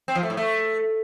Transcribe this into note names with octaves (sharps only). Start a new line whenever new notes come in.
C4
F3
A3
A2
A3